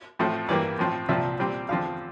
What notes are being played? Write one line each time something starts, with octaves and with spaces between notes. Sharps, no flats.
A2 F3 A3 C4
G2 E3 G3 A#3 D5
A2 F3 C4
C2 A#2 F3 C4 E5
A#2 G3 C4
E2 D3 F3 C4 F5